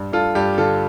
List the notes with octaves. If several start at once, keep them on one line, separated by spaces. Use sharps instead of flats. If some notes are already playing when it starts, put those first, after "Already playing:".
Already playing: G2
G2 F4 A4
G2 G4
D3 F4 A4